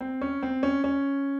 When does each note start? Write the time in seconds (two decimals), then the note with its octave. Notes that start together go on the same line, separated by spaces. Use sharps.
0.01 C4
0.21 C#4
0.43 C4
0.63 C#4
0.84 C#4